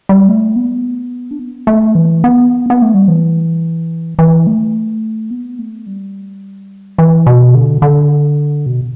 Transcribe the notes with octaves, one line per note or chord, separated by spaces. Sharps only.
G3
A3
B3
D4
B3
A3
E3
B3
B3
A3
G3
E3
E3
A3
B3
A3
G3
E3
B2
D3
D3
B2